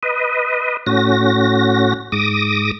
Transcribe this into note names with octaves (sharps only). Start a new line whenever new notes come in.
B4 D#5
A2 C#4 F#4 A#6
G#2 D6 D#6 A#6